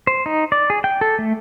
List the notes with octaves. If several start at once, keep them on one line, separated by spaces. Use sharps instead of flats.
C5
D#4
D5
G#4
G5
A4
A3